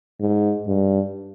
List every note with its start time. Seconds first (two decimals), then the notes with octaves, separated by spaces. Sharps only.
0.21 G#2
0.67 G2